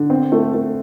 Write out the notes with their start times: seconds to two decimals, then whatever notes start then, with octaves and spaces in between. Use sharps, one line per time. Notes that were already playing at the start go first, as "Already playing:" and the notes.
Already playing: D3
0.10 C4
0.32 A3
0.54 A3